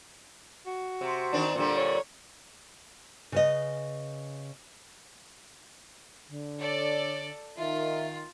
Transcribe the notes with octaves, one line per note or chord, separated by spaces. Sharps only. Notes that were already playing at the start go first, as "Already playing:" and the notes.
F#4
C3
D#3 C4 D4
A#2 D3 G3
C#5
C#3 B4 D#5
D3
A4 C#5 D5
D#3 F4 E5